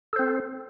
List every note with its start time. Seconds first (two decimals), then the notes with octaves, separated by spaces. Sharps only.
0.13 A4
0.16 C5
0.19 C4